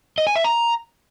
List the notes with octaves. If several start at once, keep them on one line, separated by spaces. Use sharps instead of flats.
D#5
G#5
E5
A#5